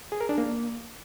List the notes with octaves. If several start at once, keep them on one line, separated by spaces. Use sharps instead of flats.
G#4
A#4
D4
A#3